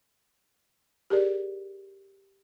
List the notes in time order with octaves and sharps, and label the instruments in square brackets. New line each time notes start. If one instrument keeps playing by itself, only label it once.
[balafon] G4 G#4 A#4 D5